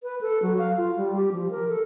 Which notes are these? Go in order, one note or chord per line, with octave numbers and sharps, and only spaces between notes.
B4
A4
F#3
F5
F4
G3
G4
F3
A#4
A4